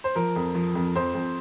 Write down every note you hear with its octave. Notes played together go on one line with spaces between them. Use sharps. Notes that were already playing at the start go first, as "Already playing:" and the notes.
C5
F3 A#4
F2
F3
F2
F2 C5
F2